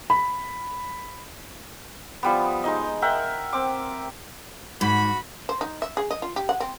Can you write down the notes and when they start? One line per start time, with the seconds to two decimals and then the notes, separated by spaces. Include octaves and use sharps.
0.10 B5
2.23 F3 G3 B3
2.64 G#3 D#4 D#5
3.02 A#4 E5 F#5 G5
3.53 C4 D6
4.81 G#2 F#4 B5
5.49 C5
5.61 D#4
5.82 E5
5.97 G#4
6.11 D#5
6.22 F4
6.36 G4
6.49 F#5
6.60 C4